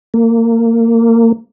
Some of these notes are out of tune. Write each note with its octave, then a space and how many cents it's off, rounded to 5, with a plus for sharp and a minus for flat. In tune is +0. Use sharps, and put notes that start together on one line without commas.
A#3 -25